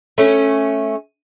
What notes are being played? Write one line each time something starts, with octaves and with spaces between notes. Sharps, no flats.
A3 C#4